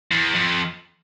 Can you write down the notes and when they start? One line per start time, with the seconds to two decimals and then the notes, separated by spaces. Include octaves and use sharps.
0.11 E2
0.35 F2